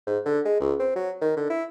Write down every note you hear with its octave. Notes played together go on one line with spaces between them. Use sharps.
G#2
D3
G#3
C#2
C4
F#3
D#3
D3
E4